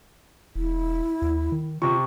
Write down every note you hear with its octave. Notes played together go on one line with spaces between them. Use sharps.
E1 E4
D#2
D#3
C3 F4 C#6